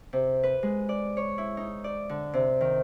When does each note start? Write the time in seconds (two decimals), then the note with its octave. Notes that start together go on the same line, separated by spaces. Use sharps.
0.13 C3
0.43 B4
0.63 G#3
0.89 D5
1.17 C#5
1.38 E4
1.57 D#4
1.84 D5
2.09 D3
2.33 C3
2.61 D#3